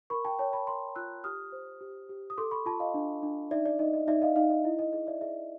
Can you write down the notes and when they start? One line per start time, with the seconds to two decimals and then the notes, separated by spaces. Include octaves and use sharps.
0.10 A#4 B5 C#6
0.25 G5 A5
0.39 C#5 G5 A5
0.53 A5 B5
0.67 A#4 A#5 C6
0.95 F4 E6 F#6
1.24 G4 D#6 F6
1.52 C5
1.81 G4
2.09 G4
2.30 D#6
2.38 A4 C6 D6
2.51 B5 C#6
2.66 F4 A5 B5
2.80 D#5 F5
2.94 D4
3.23 D4
3.51 D#4 D5 E5
3.65 D5
3.79 D#4 D#5
3.94 D#5
4.07 D#4 D5 E5
4.22 D#5 F5
4.36 D#4 D#5 F5
4.50 D#5
4.65 E4 D#5
4.79 D#5
4.93 G#4 D#5
5.07 D5 E5
5.21 G#4 D5 E5